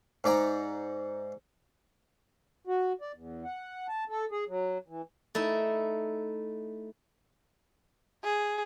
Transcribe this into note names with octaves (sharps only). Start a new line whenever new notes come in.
G#2 D5 A#5
F#4
D5
E2
F#5
A5
A4
G#4
F#3
E3
A3 D#4 E4
G#4